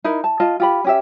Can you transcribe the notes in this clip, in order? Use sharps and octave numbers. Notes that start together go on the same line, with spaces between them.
D#4 E4 A#4 B5
A5
F4 D#5 A5
F4 G4 B5
C#4 G4 E5